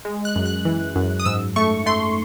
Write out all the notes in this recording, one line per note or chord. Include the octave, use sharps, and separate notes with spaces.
G#3
F#6
F#2
F#6
E3
F#2
D#6
G#2 E6
A3 C#6
A3 C6